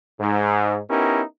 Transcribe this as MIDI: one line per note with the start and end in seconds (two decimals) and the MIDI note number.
0.19 0.79 44
0.89 1.21 59
0.89 1.21 61
0.89 1.21 63
0.89 1.21 64
0.89 1.21 67
0.89 1.21 70